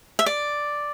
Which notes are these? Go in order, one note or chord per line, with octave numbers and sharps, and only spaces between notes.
E5
D5